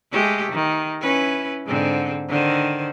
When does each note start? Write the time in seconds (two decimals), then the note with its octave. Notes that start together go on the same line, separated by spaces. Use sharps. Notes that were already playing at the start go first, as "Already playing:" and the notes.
0.12 G#3 A3 G4
0.52 D#3
1.01 C#4 E4 B4
1.66 G#2 D3 C4
2.28 D3 D#3 C5